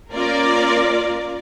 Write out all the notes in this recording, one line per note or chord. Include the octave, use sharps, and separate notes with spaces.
A#3 C#4 F4 A#4 D5